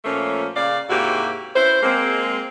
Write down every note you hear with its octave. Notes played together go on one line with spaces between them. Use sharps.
A#2 F3 A3 A#3 C#4
C#3 A#3 D5 F5
G#2 C3 A#3 E4 F#4 G4
C#4 E4 B4 C5
G#3 A#3 C4